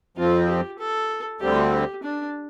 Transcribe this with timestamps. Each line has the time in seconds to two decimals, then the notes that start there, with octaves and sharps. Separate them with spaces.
0.17 F2 F3 C4 F4
0.49 G4
0.79 A4
1.41 D2 D3 G3 C4 G4
1.72 G4
2.03 D4